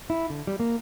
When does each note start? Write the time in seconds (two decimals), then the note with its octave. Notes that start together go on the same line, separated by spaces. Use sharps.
0.10 E4
0.30 D3
0.47 G3
0.60 A#3